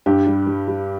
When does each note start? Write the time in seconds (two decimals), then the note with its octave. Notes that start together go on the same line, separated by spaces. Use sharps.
0.06 G2 G4
0.27 G3
0.47 G3
0.68 G3